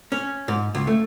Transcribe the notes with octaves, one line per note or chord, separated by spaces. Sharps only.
C#4
G#2
C#2
A3